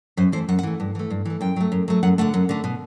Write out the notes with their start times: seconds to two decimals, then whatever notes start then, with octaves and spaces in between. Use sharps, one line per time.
0.17 F#2 C5
0.32 E3 A3 C5
0.48 F#2 F#5
0.59 F#5
0.63 E3 A3
0.80 G2
0.95 E3 A3
1.10 G2
1.25 E3 A3
1.41 F#2 G5
1.56 F#3 A3
1.72 F#2
1.88 F#3 A3
2.03 F#2 F#5
2.18 D3 A3 F#5
2.34 F#2
2.49 D3 A3
2.64 B2